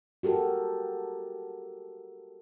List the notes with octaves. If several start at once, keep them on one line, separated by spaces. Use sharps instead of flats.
F#4 G4 A4 A#4